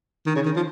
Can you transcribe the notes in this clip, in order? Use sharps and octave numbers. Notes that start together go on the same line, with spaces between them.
D#3
C#3
D#3
F3